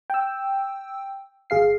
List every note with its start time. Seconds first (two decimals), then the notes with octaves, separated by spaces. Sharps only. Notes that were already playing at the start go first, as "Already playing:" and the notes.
0.10 G5 E6
1.50 G1 G#4 F5 C7